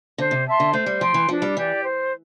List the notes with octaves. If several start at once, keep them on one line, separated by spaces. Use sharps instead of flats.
D3 C5
C3
E5 A5 C6
D3
A3 C5
G3
F3 G5 C6
E3
F3 D4
G3
E3 G4 D5
C5